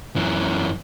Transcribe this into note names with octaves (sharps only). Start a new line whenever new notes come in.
F#2 E3